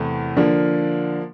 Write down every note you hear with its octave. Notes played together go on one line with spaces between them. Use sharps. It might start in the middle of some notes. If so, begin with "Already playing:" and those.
Already playing: E2 C3 E3 A3
D3 F3 A#3 D4